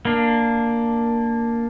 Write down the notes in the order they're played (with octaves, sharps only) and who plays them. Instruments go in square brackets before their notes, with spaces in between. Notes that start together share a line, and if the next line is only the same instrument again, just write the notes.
[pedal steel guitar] A#3 D4